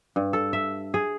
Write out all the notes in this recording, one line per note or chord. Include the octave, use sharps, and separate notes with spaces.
G2
A4
E5
G#4